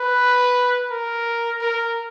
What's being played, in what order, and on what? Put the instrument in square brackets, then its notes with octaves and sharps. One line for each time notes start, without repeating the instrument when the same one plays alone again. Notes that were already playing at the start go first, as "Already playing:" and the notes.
Already playing: [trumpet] B4
A#4
A#4